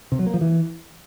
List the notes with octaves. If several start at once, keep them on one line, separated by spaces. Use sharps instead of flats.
C3
F#3
A#3
F3
E3